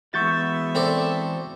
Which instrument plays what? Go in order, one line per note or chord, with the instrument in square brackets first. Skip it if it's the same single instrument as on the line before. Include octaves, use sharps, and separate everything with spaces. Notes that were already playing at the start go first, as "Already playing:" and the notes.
[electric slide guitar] E3 G#3 F#4 [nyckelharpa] B3 E5 [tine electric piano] C#6 G6 A6
[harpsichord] C4 A4 D5